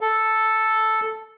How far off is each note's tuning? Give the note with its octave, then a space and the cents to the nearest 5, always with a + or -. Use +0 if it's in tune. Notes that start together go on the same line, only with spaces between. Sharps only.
A4 +0